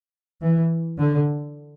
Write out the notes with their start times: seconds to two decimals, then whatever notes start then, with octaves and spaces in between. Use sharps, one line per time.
0.41 E3
0.98 D3